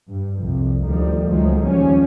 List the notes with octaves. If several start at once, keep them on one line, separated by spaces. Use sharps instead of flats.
G2
C2 F2
D2 D#3 F3 G3
C#2 D#3 F3 F#3 G#3 A3
D#2 F3 G3 C#4